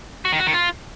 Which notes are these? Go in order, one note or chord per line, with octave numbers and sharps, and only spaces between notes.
F#4
D#3
F#4
D#3
F4